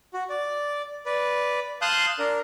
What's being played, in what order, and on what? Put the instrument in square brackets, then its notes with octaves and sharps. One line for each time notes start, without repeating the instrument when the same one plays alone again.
[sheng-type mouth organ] F#4
D5
B4 D5
F5 A5 C6 D#6 F#6 G6
D4 A#4